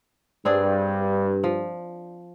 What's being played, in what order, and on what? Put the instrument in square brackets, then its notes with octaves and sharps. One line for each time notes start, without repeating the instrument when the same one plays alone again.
[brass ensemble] G2 [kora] C4 D4 G#4
[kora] F3